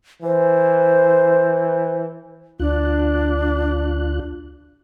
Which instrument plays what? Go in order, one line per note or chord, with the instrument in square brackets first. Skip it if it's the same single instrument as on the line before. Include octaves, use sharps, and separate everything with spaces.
[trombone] E3 [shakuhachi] C5
[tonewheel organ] D2 F4 F#6 [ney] D4